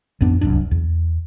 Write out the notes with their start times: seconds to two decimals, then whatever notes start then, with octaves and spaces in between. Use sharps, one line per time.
0.21 A1 F2 B3 D4
0.41 D1 C2 F#2 D4
0.71 E2